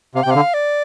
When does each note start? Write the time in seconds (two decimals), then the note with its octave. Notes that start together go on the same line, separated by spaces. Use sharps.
0.15 C3 F5
0.23 G5
0.26 C3
0.31 D3 F5
0.54 D5